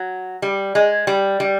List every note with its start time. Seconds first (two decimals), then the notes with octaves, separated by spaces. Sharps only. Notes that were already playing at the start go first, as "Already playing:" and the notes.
Already playing: F#3
0.42 G3
0.75 G#3
1.07 G3
1.40 G3